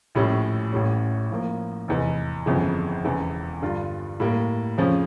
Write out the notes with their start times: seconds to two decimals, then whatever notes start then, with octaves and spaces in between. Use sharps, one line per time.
0.15 A#1 A2 G3 C#4
0.73 A1 A2 G3 C#4
1.31 A2 F3 A#3
1.88 F1 E2 E3
2.46 G1 F2 C#3 E3
3.05 E1 E2 C#3 E3
3.62 G2 D3 G3 D4 F4
4.20 A2 G3 A#3
4.78 F2 C#3 F3 C#4